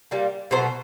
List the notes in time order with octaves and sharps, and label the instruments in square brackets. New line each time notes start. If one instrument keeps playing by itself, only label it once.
[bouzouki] A#2 G3 A#3
B2 F#3 A3 C5